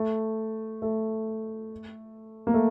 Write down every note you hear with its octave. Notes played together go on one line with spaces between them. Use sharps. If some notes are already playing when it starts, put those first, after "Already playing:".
Already playing: A3
A3
A#3
A3